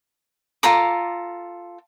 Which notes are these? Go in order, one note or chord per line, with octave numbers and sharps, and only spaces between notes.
F4 A4 A#5 D6